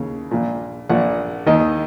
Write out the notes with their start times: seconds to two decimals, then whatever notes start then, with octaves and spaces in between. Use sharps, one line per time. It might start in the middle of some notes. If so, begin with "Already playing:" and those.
Already playing: D#2 C#3 C#5
0.31 A#1 A#2
0.89 A#1 A#2 F#5
1.47 D#2 D#3 D#5